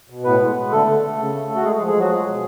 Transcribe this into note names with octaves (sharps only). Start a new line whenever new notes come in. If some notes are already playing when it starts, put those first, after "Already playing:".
B2
A2 B3 B4
G#3
G#3
D3 A3 A4
D3
A3
C#3
A3
A3
F#4
G#3 G#4
G#3 G#4
F3
G#3 G#4
F3 F#3 F#4
G#3 G#4
B2